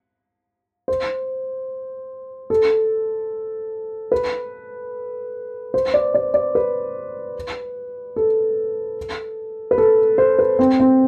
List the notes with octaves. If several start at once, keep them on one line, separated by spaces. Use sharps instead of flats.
C5
A4
B4
C5
D5
D5
D5
B4
A4
B4
A4
C5
B4
C4
C4